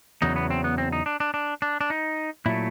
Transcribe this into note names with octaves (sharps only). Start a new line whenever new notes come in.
E2 C#3 F#3 D#4
B3
C4
B3
C4
D#4
D4
D4
D4
D4
D4
D#4
A#2 F#3 A3 E4